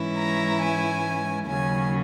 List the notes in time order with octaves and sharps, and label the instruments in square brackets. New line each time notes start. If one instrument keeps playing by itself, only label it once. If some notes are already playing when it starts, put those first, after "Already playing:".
Already playing: [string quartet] G#2 E3 G#3 C#4 E4
A#5
G#5
D#2 C#3 F#3 C#4 G#5